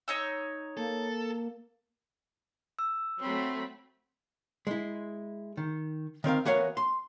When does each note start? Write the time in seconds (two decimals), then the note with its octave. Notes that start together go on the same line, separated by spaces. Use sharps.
0.08 D#4 C#5 E6
0.77 A#3 A4
2.79 E6
3.20 F#3 A3 C4 B5
4.67 G#3 E4
5.57 D#3
6.24 D#3 C4 A#4 F5
6.45 E3 B3 F#4 A#4 C#5 F5
6.77 C6